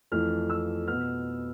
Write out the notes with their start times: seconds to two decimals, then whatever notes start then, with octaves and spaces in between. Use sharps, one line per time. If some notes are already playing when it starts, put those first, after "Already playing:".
0.12 F2 E3 A3 F6
0.50 E6
0.88 B2 B3 F6